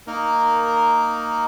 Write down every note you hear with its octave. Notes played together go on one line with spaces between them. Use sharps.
A#3 D#4 A#4